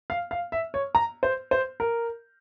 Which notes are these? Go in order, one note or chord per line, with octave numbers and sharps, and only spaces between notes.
F5
F5
E5
C#5
A#5
C5
C5
A#4